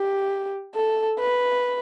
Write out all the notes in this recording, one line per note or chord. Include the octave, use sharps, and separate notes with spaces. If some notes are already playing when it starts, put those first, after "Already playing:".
Already playing: G4
A4
B4